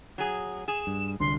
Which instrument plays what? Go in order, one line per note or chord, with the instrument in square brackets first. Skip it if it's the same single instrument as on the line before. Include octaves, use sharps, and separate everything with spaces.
[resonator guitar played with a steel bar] F#3 G#4
[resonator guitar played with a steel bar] G#4 [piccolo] E7
[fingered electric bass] G2
[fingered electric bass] C2 D3 [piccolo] C6